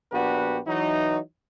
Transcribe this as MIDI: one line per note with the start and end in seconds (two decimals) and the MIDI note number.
0.12 0.59 34
0.12 0.59 59
0.12 0.59 62
0.12 0.59 66
0.12 0.59 67
0.12 0.59 71
0.66 1.19 52
0.66 1.19 54
0.66 1.19 63